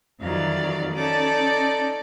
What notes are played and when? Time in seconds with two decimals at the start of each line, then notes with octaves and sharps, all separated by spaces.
0.20 F2 D#3 E3 F#3 D5 F5
0.95 C#4 D#4 A4 D5